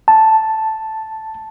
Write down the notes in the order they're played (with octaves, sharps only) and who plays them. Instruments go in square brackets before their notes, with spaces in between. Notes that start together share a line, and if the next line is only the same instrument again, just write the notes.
[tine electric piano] A5